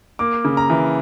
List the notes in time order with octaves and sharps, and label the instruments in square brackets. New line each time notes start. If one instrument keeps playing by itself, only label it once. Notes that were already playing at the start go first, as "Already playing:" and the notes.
[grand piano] A#3 D6
C#3
A#5
E3